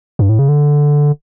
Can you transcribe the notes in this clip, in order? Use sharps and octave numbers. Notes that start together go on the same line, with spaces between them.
G2
A2
C#3
D3